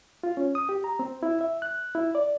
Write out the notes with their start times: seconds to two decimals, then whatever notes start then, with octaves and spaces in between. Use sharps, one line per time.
0.23 F4
0.37 C#4
0.55 D#6
0.69 G4
0.84 A#5
0.99 C4
1.23 E4
1.41 E5
1.62 F#6
1.95 E4
2.15 D5